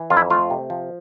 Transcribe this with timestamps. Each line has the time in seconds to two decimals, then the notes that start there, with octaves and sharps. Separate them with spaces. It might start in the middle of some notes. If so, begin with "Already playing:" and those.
Already playing: E3
0.10 F2 F4
0.17 E4
0.30 A3 F4
0.50 C3
0.70 F3